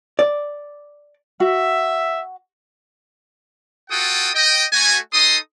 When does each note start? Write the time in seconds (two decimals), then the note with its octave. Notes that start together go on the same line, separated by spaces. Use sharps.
0.19 D5
1.40 F#4 E5
3.90 F4 F#4 A4 F#5 G5 D#6
4.34 D#5 G5
4.72 A3 F#4 G#5
5.13 D#4 A4 D#5 C6 D#6